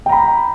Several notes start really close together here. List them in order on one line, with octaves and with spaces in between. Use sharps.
G5 A#5 B5